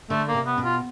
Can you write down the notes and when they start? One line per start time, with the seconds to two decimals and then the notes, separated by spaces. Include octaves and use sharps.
0.10 D3 A3
0.28 A#3
0.34 C3
0.46 B3
0.58 B2
0.64 F4